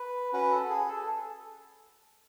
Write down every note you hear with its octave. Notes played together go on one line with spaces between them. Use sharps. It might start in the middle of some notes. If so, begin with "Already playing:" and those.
Already playing: B4
C#4 F#4 B4
A4
G#4
A4